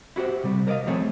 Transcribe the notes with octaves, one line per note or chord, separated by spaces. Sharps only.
E4 F#4 G4 C5 E5
C3 G3
A#4 C5 D5 D#5 F5
F3 A3 C4 G#4 C#5 E5